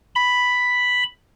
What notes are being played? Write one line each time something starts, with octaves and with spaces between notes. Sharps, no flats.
B5